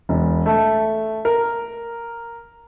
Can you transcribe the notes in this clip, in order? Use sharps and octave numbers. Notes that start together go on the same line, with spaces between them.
E1
A3
A#4